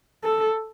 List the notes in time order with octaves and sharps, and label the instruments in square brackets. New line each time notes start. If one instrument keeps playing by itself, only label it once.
[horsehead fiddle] A4